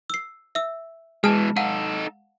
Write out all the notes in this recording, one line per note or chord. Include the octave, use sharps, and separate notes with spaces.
E6 C7
E5 E6
B2 E3 G#3 A5 F6
D#4 A4 F5 F#5 D#7